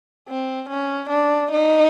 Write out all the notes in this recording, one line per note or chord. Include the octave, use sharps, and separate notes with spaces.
C4
C#4
D4
D#4